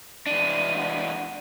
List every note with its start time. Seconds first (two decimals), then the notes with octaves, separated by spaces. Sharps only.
0.27 E2 D4 D#7
0.77 F#5